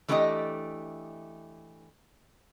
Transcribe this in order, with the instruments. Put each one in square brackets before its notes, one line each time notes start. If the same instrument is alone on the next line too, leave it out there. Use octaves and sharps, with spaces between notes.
[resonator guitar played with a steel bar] E3 A3 D4 G4 B4 D#5